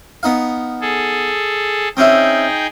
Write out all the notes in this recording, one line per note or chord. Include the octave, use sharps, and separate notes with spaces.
B3 D#4 F5
G#4 A4
C4 C#4 D#4 E4 G#4 G5